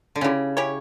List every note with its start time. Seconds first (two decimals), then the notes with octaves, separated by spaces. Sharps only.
0.15 D3
0.21 C#3 C#4 E4 G4
0.57 C#4 E4 G4 C#5